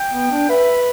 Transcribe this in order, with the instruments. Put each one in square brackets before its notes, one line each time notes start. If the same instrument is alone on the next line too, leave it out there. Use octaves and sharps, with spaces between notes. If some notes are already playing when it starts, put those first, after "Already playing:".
Already playing: [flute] G5
[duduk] B3
D4
[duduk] B4 [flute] E5